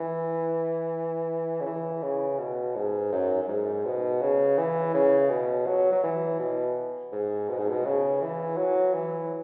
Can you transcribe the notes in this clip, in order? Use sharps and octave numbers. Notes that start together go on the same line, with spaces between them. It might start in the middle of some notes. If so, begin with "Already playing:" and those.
Already playing: E3
C#3
E3
C#3
B2
G#2
F#2
F#2
G#2
B2
C#3
E3
C#3
B2
F#3
F#3
E3
B2
G#2
B2
G#2
B2
C#3
E3
F#3
E3